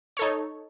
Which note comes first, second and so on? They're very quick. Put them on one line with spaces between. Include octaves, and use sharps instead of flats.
C#5 A4 D#4